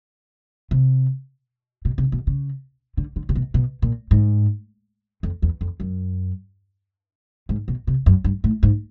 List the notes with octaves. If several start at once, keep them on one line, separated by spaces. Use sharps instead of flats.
C3
B2
C3
B2
C#3
D3
D3
C3
B2
B2
A#2
G#2
F2
E2
F2
F#2
G#2
B2
C3
F#2
G2
A2
G#2